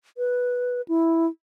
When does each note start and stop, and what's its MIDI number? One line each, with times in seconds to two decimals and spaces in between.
0.18 0.81 71
0.88 1.27 64